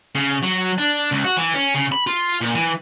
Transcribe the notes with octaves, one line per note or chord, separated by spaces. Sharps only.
C#3
F#3
D4
C#2
F#4
E3
C#4
C#3
B5
F4
A#2
E3